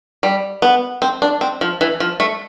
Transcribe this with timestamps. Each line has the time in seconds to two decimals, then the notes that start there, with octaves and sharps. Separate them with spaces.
0.23 G3
0.62 B3
1.02 C4
1.22 D4
1.41 C4
1.61 F3
1.81 E3
2.00 F3
2.20 A3